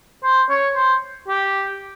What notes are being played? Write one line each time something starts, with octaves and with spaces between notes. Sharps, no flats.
C5
C#5
C5
G4